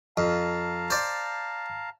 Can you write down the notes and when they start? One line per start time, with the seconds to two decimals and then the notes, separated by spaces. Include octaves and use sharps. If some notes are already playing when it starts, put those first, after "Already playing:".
0.17 F2 F5 A5 A#5
0.90 C5 D5